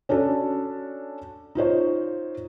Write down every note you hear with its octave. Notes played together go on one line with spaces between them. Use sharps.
C#4 D4 F#4 A4
D#4 F4 C5 C#5